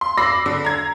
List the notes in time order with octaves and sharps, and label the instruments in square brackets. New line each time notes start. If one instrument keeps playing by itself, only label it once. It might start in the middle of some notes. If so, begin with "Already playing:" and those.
[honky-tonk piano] C6
B5 D6 E6 A#6 C7
D3
A#5 G#6